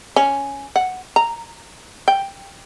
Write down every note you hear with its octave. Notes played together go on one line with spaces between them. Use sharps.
C#4
F#5
A#5
G5